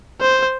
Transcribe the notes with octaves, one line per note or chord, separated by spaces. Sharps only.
C5